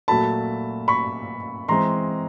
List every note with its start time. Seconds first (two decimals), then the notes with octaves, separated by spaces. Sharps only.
0.08 A#2 F#3 A3 A5 B5
0.88 B5 C#6
1.68 E3 G#3 C4 A#5 C6